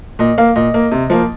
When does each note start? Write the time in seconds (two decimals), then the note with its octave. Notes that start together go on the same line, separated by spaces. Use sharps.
0.19 A#2 D#5
0.38 A#3 F5
0.56 A#2 D#5
0.74 A#3
0.92 C3
1.10 F3 A#3